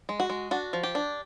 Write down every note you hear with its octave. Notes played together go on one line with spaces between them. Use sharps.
G#3
F#4
G#3
D4 F#4
F3
G4
D4